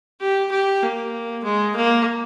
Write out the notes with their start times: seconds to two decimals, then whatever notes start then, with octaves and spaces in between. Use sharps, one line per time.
0.20 G4
0.51 G4
0.82 A#3
1.44 G#3
1.76 A#3